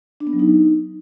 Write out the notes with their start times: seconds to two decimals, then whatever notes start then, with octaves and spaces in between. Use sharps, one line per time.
0.20 D4
0.27 B3
0.33 F#3
0.39 D#4